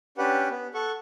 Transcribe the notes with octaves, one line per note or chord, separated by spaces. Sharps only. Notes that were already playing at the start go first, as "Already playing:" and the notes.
C#4 D4 G4 B4 F#5
B3
A4 F#5 C#6